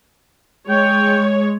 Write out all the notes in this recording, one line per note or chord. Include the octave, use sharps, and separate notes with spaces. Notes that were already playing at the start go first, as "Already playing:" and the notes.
G#3 C#5 G5